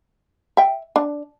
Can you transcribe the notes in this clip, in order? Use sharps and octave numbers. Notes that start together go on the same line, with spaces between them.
E5 G5
D4